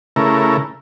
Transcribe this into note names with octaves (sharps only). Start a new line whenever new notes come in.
C#3 A3 E4 A#4